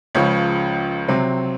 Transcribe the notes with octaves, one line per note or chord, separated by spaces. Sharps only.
C#2 C#3 F3 C#5
C3 F#3 C4